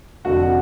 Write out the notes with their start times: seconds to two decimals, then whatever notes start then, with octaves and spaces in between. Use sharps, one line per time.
0.25 F1 F2 D3 F#4 F#5